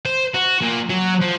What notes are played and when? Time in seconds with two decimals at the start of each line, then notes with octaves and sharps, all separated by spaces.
0.05 C5
0.34 F#4
0.62 A#2
0.90 F#3
1.21 F3